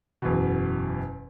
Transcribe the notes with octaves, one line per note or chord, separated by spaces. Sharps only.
F#1 E2 B2